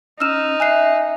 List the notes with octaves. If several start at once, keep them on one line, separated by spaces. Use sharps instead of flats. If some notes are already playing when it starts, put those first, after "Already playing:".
C#4 D#4 E6 F6 E7
E5 G#5 F#6 C7